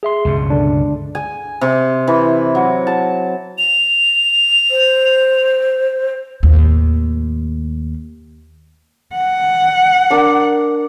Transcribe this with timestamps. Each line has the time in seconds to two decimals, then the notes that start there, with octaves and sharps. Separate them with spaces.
0.03 G#4 E5 C6
0.25 C#2 G2 B2
0.50 D3 D4
1.15 G#5
1.61 C3
2.07 E3
2.55 F#3
2.87 A5
3.58 F7
4.71 C5
6.43 D#2 A2
9.15 F#5
10.11 D4 A#4